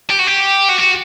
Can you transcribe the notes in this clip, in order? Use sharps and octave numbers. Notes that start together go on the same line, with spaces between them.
G4
F#4
G4
F#4
F#4